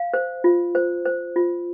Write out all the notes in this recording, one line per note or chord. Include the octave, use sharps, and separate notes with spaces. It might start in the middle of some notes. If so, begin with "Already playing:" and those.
Already playing: F5
C5
F4
C5
C5
F4